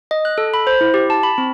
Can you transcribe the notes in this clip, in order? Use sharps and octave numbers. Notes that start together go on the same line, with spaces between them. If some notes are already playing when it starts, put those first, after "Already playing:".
D#5
F#6
A4
B5
C5
E4
G4
A5
B5
C4